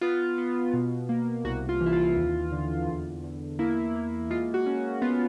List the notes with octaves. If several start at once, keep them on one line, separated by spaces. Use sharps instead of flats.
B3 F4
B3
B2
A#3
C2 F#4
F4
E3
E4
F4
D#2
D3
E2
E2
A#3 E4
A#3
G#3 F4
F#4
C#4
B3 F4